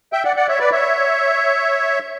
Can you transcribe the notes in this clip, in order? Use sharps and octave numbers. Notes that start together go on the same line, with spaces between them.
E5 G5
D5 F#5
D5 F#5
C#5 E5
B4 D5
C#5 E5